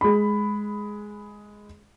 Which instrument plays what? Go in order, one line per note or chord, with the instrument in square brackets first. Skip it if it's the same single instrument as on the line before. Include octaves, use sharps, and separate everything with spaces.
[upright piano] G#3 B5